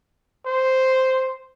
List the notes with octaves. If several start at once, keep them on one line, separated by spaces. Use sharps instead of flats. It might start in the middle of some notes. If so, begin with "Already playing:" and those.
C5